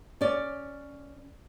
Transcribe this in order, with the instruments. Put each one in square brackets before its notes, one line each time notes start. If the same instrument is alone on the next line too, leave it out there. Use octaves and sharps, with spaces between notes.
[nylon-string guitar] C#4 D5